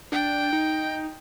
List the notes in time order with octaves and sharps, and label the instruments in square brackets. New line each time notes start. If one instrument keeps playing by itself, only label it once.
[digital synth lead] D4 [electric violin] G5
[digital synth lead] D#4